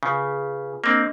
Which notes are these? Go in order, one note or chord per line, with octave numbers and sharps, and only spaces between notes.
C#3 F4 G#4 B4
A#3 C4 D4 D#5